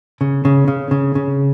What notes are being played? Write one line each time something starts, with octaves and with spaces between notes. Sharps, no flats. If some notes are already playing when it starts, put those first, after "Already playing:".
C#3
C#3
C#3
C#3
C#3